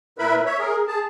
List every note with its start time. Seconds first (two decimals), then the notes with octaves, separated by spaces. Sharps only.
0.19 A#2 E4 A#4 B4 E5 B5
0.46 C#5 E5
0.58 G#4 A#4
0.87 G#4 A5